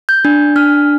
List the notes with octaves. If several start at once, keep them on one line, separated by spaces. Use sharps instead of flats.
G6
D4
D4 F6